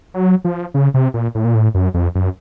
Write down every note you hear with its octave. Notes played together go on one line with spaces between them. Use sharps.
F#3
F3
C#3
C3
A#2
A2
A#2
A2
F#2
F2
F#2